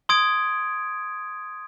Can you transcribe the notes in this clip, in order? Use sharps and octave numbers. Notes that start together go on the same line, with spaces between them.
C6 D#6 G#6 D7